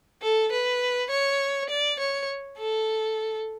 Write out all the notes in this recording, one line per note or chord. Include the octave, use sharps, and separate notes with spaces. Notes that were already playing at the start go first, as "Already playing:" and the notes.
A4
B4
C#5
D5
C#5
A4